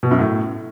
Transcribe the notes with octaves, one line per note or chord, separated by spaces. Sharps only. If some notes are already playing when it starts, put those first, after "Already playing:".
B2
F#2
A2